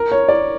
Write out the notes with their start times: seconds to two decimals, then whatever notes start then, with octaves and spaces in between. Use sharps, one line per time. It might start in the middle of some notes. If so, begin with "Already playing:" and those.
Already playing: A#4
0.12 C#5
0.29 D5